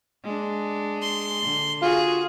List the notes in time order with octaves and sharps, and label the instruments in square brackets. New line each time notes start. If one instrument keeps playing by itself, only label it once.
[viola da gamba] G#3 D4
[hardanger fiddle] C6
[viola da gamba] D3
[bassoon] F4 [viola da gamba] F#4 [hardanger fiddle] G#4